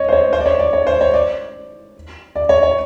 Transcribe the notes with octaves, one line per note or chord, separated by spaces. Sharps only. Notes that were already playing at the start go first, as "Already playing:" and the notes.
Already playing: C#5 D#5
C5
C#5
C5
D5
C#5
D5
C#5
C5
C#5
D5
D5
C#5
C#5